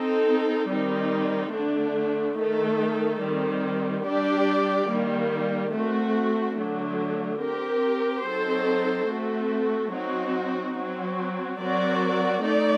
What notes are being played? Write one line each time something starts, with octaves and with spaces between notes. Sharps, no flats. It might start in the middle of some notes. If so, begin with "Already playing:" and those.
Already playing: C4 D#4 A4
D#3 G3 C4 D#4
D3 A3 D4
D#3 A3 D#4 A4
D#3 G3 C4
G3 D4 G4 D5
D#3 G3 A#3
A3 C4 F#4
D3 F#3 A3 D4
C4 G4 A#4
F#3 C4 D#4 A4 C5
A3 C4 F#4 A4
F#3 C4 D#4 F#4
F#3 C4 F#4
F#3 C4 F#4 A#4 D5
A3 D#4 A4 D5